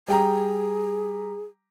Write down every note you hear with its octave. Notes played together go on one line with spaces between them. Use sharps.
G3 G#4 G5 A#5